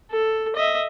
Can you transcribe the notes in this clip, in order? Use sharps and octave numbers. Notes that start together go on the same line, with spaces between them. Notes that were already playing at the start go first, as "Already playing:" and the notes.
A4
D#5 E5